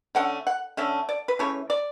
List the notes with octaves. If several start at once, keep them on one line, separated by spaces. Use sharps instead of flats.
D3 A3 C#4 F#5
F#5
D3 A3 C#4 E5
D5
B4
C#3 E3 A3 C#4 C#5
D5